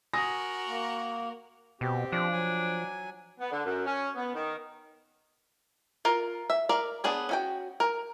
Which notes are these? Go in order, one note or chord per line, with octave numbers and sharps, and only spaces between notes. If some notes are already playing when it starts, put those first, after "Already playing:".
F#4 A#4 G#5 D#6 A#6
A#3
B2 C4 G4
F3 D4
F#3 G#5
B3
D3
F#2
C#4
B3
D#3
F4 A#4
E5
A#4 D5 F5
B3 D4 G#4 C#5
C#4 F#4 G5
A#4